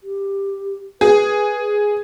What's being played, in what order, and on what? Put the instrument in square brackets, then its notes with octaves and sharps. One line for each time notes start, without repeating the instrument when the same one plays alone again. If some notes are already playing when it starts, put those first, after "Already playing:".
[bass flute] G4
[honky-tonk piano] G#4 [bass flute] B4